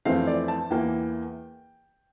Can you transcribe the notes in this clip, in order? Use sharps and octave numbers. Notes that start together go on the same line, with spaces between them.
F2 E3 A3 C4 F5
D5
A5
E2 E3 A#3 G5